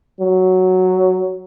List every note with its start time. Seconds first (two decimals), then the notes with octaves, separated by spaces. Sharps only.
0.20 F#3